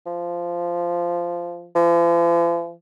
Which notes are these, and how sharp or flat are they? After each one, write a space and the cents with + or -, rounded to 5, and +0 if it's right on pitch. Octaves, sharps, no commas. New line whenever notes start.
F3 -10
F3 -45